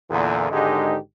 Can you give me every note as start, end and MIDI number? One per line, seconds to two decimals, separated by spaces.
0.10 0.48 40
0.10 0.48 46
0.10 0.48 50
0.52 0.96 32
0.52 0.96 44
0.52 0.96 50
0.52 0.96 56
0.52 0.96 63
0.52 0.96 67